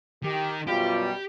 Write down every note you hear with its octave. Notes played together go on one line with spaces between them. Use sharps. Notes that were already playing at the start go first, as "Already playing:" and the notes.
D#3 G4
F#2 B2 G3 F4 G4